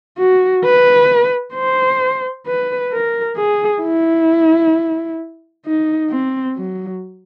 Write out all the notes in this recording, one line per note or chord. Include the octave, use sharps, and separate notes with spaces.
F#4
B4
C5
B4
A#4
G#4
E4
D#4
C4
F#3